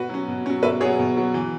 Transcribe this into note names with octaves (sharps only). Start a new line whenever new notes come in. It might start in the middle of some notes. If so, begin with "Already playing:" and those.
Already playing: B2 F#4 B4
F#3 C#4
B2
F#3 C#4
B2 B4 E5
F#3 B3 G#4 C#5
B2
F#3 B3
E3